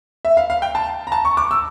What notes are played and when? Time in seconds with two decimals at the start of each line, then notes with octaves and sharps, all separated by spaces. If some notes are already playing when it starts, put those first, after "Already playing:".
0.25 E5
0.37 F5
0.50 F5
0.62 G5
0.75 A5
1.07 A#5
1.12 A5
1.25 C#6
1.37 D6
1.51 E6